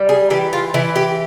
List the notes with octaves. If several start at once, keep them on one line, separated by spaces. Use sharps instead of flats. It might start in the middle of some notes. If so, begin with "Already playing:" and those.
Already playing: G3
G#4
E3 G4
F4
E3 E4
G4